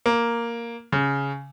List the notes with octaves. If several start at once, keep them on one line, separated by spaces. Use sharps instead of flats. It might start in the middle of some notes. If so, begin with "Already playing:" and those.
A#3
C#3